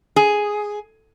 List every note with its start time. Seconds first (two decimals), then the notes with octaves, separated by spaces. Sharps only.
0.16 G#4